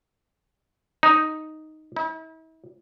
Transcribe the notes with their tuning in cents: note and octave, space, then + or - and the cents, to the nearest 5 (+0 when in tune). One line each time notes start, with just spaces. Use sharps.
D#4 +0
E4 -45